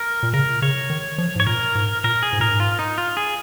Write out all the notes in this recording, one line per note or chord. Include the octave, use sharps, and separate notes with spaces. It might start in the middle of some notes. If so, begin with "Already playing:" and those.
Already playing: A#4
A#2
C#3 A#4
C#3 C#5
D#3
F3
G#2 C#5
A#2 A#4
G#2
A#2 A#4
G#4
G#2
A#2 A#4
G#2
F4
D#4
F4
G#4